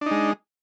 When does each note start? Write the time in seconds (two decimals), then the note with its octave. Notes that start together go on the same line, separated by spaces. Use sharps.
0.01 D4
0.06 D#4
0.11 G#3